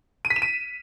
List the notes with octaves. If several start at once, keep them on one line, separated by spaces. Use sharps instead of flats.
D#7
B6
E7
D#7